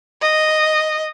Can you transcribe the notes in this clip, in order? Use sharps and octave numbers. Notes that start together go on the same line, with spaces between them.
D#5